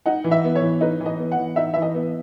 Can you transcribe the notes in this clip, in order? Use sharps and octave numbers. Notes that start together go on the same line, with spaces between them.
D#4 F#5
E3
E5
B3
C#5
E3
D#4 B4
E3
D#5
B3
F#5
E3
D#4 E5
E3 E5
D#5
B3